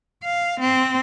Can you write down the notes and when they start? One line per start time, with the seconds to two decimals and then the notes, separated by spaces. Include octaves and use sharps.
0.24 F5
0.60 C4